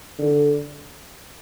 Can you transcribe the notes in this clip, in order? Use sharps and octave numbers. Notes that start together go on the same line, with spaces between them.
D3